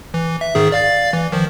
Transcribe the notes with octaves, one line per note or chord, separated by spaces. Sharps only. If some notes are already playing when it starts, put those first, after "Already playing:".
E3
E5
G#2 D#3 G#4
D5 F5 A6
E3
D#3 F3